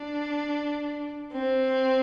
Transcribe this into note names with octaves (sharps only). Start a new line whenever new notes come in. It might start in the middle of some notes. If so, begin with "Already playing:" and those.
Already playing: D4
C4